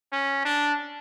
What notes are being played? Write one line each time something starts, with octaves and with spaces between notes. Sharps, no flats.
C#4
D4